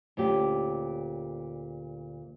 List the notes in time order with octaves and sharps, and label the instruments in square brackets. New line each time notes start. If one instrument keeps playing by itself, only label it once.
[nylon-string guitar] D2 A#2 C#4 G4